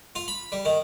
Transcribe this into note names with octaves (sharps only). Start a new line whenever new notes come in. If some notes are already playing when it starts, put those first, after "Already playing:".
F4
B5
G3
D#3